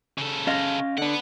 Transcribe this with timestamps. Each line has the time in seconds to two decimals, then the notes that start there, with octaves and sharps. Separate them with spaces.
0.18 C#3 A4
0.47 C#4 D#5 F5
0.98 D3 B3 D4 F#5